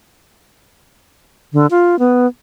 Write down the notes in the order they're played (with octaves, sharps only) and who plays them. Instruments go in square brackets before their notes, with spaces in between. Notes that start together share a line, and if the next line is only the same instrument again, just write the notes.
[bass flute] D3
F4
B3